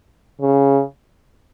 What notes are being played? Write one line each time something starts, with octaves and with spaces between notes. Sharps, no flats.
C#3